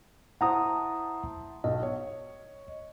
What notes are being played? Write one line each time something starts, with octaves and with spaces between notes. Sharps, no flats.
E4 C5 F#5 A5 A#5 D#6
B1 D#5
C#5